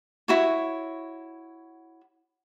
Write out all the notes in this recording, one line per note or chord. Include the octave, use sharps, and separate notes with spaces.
E4 F#4 C#5